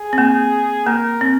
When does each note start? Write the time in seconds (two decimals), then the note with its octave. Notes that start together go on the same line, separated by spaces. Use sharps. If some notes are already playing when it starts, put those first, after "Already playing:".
Already playing: G#4
0.13 C4
0.18 A#3
0.86 A#3 A#4
1.21 C4